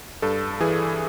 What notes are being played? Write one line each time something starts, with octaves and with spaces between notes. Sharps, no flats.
G2 A4
E3 G#4